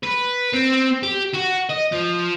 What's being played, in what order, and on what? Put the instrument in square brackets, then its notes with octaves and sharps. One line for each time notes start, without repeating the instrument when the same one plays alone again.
[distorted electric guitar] B4
C4
G4
F#4
D#5
F3